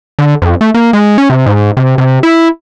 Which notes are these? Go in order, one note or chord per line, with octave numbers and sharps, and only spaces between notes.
D3
F2
A3
A#3
G#3
C#4
C3
G#2
C3
C3
E4